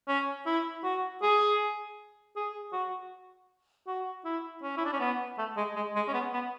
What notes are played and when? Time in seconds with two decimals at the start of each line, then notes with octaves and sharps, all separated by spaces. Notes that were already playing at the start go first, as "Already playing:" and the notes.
0.08 C#4
0.46 E4
0.84 F#4
1.22 G#4
2.36 G#4
2.73 F#4
3.87 F#4
4.25 E4
4.63 C#4
4.77 E4
4.85 D4
4.93 C#4
5.00 B3
5.38 A3
5.57 G#3
5.76 G#3
5.96 G#3
6.08 C#4
6.14 B3
6.34 B3